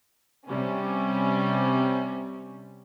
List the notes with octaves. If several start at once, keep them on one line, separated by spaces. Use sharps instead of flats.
C3 G3 C#4